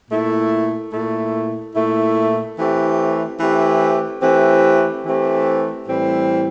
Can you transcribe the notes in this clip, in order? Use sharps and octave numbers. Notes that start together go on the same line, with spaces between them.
A#2 A3 E4
A#2 A3 E4
A#2 A3 E4
E3 A3 C4 G4
E3 A3 C4 G4
E3 A3 C4 G4
E3 A3 C4 G4
A2 E3 G3 C4